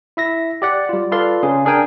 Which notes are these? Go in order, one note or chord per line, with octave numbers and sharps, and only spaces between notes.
E4 E5 A#6
G4 D5 F#5
G3 F4
F4 A4 B4 D5 F5 C6
C#3 G#4
D4 G#4 A#4 G5 G#5